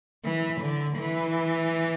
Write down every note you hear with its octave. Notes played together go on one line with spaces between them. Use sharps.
E3
D3
E3